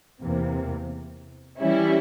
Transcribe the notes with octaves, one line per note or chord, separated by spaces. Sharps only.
E2 C3 E3 A#3
E3 G3 C#4 E4